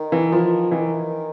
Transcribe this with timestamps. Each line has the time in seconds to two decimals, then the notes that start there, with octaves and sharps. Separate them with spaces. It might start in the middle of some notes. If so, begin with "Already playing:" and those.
Already playing: D#3
0.12 E3
0.32 F3
0.71 D#3 E3